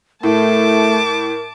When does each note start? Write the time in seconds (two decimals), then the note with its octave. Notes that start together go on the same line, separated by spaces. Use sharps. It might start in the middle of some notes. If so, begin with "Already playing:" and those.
0.23 A2 A3 A#4 A5 D6